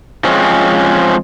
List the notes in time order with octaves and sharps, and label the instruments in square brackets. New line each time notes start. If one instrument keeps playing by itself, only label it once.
[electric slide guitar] F3 G#3 C4 C#4